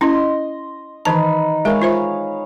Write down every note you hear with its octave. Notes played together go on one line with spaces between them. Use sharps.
C#4 E4 D#5 C6
D#3 E3 D#4 B4 A5
G#3 G#4 A#4 C#5 F5
F4 C5 E5